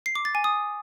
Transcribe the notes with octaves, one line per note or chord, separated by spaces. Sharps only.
C7
D6
A6
G#5
D#6